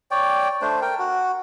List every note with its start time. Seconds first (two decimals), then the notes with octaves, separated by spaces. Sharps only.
0.11 C#5 D5 G5
0.62 A3 D4 C5
0.82 A#4 G5
0.99 F#4